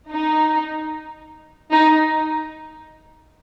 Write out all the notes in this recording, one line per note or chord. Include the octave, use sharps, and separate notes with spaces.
D#4
D#4